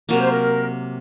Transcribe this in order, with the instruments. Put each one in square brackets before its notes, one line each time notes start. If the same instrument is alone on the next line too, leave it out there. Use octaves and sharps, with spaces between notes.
[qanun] C3 F#3 A#3 [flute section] A#4
[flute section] C5
A#4